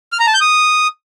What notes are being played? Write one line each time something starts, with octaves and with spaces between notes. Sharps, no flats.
F6
A#5
A5
G6
D#6